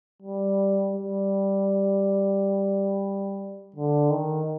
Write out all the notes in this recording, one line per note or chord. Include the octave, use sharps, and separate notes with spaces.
G3
G3
D3
D#3